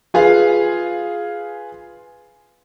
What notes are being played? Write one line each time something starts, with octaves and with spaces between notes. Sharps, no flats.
F4 G#4 B4 F5